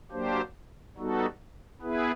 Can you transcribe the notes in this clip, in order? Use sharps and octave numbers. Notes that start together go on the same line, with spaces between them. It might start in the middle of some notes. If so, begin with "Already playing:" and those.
F#3 A#3 D4 G4 C5
G3 B3 D#4 F#4 A4
B3 E4 G#4 B4